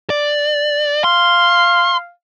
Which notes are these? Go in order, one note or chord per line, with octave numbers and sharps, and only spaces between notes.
D5
F5 C6